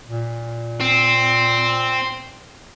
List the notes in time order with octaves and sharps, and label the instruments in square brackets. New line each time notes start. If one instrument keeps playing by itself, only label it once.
[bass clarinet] A#2
[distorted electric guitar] C4